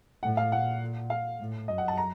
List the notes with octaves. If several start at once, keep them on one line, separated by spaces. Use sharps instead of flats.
A2 F#5
F5
A#2 F#5
F5
A2
F#2 D#5
F#5
A5
A#5